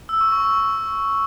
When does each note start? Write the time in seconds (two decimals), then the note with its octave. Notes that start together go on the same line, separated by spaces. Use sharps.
0.09 E6
0.21 C#6
0.32 C#6